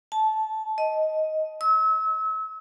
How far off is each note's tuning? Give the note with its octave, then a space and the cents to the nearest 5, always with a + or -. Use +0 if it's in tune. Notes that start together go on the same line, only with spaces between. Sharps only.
A5 -15
D#5 +10
E6 -35